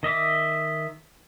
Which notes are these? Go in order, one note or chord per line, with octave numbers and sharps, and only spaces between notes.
D#3 D#5 E5 D6